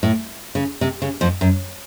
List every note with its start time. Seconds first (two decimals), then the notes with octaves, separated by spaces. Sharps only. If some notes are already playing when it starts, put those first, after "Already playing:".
0.03 A2
0.55 C#3
0.81 C3
1.02 C#3
1.21 F2 F3
1.41 F#2